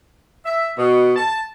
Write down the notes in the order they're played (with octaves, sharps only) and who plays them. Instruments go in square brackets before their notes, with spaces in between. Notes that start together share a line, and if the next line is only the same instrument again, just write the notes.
[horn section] E5
B2
A5